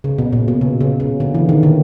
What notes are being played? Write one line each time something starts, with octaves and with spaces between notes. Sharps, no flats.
C#3
B2
A#2
B2
C#3
C#3
C#3
D3
E3
D#3
D3